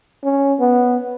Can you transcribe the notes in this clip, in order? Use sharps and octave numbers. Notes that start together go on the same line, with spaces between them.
C#4
B3